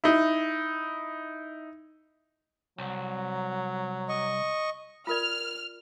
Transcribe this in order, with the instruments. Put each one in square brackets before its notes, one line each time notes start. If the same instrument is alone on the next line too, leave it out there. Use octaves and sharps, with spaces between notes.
[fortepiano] D#4 E4
[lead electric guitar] C2 [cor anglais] F#3
[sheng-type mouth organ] D#5 C#6
[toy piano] F4 A#4 D5 [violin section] F6